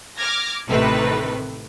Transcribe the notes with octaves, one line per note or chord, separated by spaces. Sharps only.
D6 F6 G#6 A#6
A1 C3 D#3 A3 B4